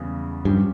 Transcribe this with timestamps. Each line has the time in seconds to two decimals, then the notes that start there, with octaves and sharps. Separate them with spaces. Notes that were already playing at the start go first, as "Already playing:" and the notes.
Already playing: E2 C#3 G3
0.45 G2 F3 C#4 G4